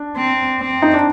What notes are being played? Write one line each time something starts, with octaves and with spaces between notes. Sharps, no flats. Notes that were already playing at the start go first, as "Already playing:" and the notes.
Already playing: D4
C4
C4
D#4
D4